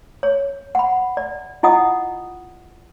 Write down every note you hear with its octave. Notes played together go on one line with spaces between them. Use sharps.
C#5
F#5 B5
D5
E4 F4 D#5 F#5 D#6